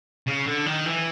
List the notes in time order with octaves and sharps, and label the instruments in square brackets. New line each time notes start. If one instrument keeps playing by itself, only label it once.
[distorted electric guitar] C#3
D3
D#3
E3